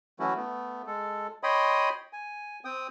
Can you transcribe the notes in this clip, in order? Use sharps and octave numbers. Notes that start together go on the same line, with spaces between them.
E3 F#3 A3 C#4 E4 F#4
A3 B3
G#3 A4
C#5 D#5 G5 B5 C6 D#6
G#5
C4 G5 D#6